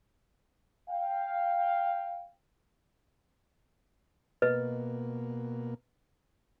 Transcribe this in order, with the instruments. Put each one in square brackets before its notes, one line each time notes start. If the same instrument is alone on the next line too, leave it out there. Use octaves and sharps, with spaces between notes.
[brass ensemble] F5 G5
[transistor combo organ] B2 A#3 [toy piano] B4 D#5